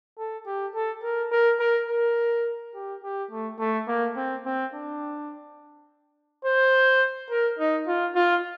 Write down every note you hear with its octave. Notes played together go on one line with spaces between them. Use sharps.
A4
G4
A4
A#4
A#4
A#4
A#4
G4
G4
A3
A3
A#3
C4
C4
D4
C5
A#4
D#4
F4
F4